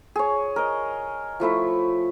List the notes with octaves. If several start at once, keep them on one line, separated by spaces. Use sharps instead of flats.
G#4 C#5
A#4 D#5
F3 A3 E4 E5